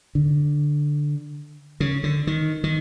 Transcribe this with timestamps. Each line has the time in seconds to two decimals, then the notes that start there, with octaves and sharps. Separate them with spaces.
0.15 D3
1.80 C#3
2.04 D3
2.27 D#3
2.64 D#3